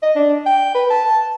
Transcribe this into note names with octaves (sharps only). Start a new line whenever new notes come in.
D#5
D4
G5
B4
A5